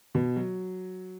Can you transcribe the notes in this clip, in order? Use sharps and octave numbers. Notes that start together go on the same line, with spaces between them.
B2
F#3